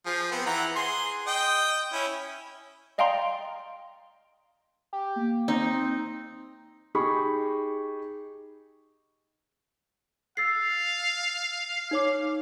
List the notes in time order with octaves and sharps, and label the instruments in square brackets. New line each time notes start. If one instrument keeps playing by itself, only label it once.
[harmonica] F3 G#4
B3 C4
E3 F#5 A#5
G#4 C6
D#5 G5
C#4 E4
[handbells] D5 D#5 F5 G5 A#5 C6
[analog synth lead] G4
[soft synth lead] A#3
[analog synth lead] C4 [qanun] D#4
[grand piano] D#4 G4 G#4 B5 C#6
[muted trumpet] F5 [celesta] E6 A6 C7
[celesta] D#4 C#5 D6